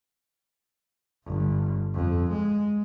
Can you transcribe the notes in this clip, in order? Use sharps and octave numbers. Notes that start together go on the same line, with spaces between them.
G1
F2
G#3